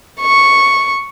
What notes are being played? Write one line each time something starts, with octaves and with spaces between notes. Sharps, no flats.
C#6